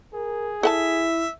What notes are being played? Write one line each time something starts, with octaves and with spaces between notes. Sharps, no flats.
G#4 A#4
E4 A4 E5 F#5 A5